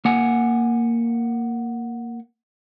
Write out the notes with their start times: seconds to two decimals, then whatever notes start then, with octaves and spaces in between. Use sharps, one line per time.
0.05 A#3 F#5 G#5